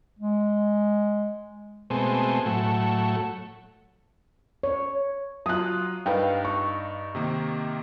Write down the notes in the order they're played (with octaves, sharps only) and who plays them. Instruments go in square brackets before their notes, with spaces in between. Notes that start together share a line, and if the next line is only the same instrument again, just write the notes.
[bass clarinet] G#3
[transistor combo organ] B2 G#3 A3 C4
A2 F#3 A3
[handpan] C#5
[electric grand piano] F#3 F4 [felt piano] D#6 F#6
[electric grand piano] G2 D#4 [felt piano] B4 F5 G5
[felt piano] C#6
[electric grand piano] C3 D#3 A#3